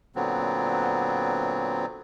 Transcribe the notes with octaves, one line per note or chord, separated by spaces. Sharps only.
A#2 D3 F#3 B3 C4